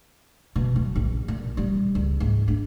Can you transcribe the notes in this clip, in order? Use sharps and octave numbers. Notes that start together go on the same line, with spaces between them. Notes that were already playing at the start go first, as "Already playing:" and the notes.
B2
F#3
A#1
A#2
G3
C#2
G#2
D4